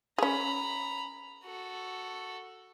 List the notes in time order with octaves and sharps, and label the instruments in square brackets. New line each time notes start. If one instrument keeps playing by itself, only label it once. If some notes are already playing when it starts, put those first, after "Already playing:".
[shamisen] C#4 G#4 [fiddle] A#5 B5
[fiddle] F#4 A4